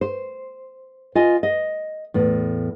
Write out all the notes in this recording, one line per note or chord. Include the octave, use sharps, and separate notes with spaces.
C5
F4 D#5 G#5
D#5
E2 A2